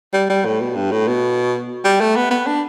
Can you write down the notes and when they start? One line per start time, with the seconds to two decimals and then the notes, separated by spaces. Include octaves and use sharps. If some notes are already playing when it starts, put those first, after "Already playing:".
0.13 G3
0.29 G3
0.45 A2
0.61 B2
0.75 G2
0.91 A2
1.07 B2
1.84 G3
2.01 A3
2.16 B3
2.31 B3
2.47 D4